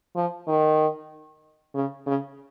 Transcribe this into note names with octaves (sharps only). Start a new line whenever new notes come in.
F3
D#3
C#3
C#3